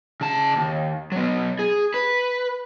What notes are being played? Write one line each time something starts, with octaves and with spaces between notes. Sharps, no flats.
C#3 A5
D#2
F#3 B3
G#4
B4